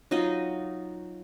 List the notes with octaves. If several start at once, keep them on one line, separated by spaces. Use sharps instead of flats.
F#3 D#4 F4 D#5